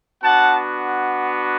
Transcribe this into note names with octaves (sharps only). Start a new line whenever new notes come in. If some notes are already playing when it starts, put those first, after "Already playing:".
B3 D4 F#4 F#5 A5